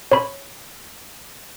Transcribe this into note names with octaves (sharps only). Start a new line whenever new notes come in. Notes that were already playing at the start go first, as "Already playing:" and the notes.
C#5 B5